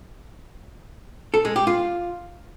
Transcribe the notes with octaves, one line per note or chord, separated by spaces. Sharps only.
A4
G#3
G4
F4